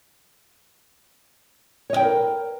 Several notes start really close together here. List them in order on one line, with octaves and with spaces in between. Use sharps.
C#5 D#5 G5 B4 A#4